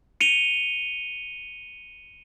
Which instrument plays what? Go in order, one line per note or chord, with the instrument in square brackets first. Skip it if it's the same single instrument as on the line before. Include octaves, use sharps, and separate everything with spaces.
[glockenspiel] C#7 D#7 F7 G7